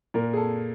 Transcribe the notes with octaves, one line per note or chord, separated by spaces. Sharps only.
A#2 A#4
G#4
A4